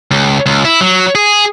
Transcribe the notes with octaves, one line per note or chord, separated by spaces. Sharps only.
C#2
C#2
E4
F#3
G#4